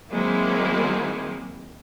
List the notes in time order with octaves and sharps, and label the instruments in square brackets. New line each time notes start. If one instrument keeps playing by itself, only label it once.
[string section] D#3 F#3 G#3 A#3 C4 E4